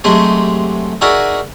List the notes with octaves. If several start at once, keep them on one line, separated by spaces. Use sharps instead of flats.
C3 F#3 G#3 A3 G4 G#4
D#4 F#4 G#4 A#4 D5 E5